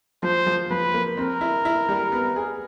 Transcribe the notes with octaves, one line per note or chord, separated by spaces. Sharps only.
F3 C5
F3
F3 B4
A#3
C4 A#4
E4
E4
G3
B3
G#4